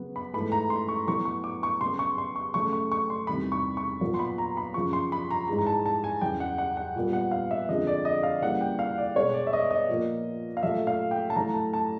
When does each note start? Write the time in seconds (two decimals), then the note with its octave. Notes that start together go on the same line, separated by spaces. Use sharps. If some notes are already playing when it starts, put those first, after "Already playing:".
Already playing: C#3 F#3 B3
0.16 B5
0.34 G#2 E3 A3 B5
0.52 A#5
0.70 C6
0.88 C#6
1.07 A2 F#3 B3 C#6
1.25 C#6
1.44 D6
1.63 C#6
1.81 C#3 F#3 B3 C6
1.99 C#6
2.18 C6
2.36 C#6
2.54 C#3 F#3 A3 C#6
2.73 C#6
2.92 C#6
3.10 C6
3.27 E2 C3 D#3 G3 B5
3.52 C#6
3.77 C#6
4.01 A#2 F#3 B3
4.14 C6
4.19 B5
4.38 A#5
4.57 B5
4.74 F#2 C#3 F3 C#6
4.93 C6
5.12 B5
5.31 A#5
5.48 G#2 E3 G#3 A#5
5.58 A#5
5.67 A5
5.86 A5
6.04 G#5
6.21 E2 C#3 F#3 G5
6.40 F#5
6.58 F#5
6.77 F#5
6.96 A#2 G3 B3
7.13 F#5
7.31 F5
7.51 E5
7.69 F2 D3 F3 G#3 D#5
7.87 D5
8.05 D#5
8.23 F5
8.42 C#3 E3 G3 A#3 F#5
8.61 G5
8.79 F5
8.98 D5
9.16 B2 G#3 B3 C#5
9.34 D5
9.47 E5
9.53 D#5
9.71 D#5
9.89 A#2 F3 A#3
10.57 F5
10.63 A#2 F#3 A3 E5
10.87 F5
11.11 G5
11.30 A5
11.36 A2 F#3 A3 A#5
11.54 A5
11.73 A5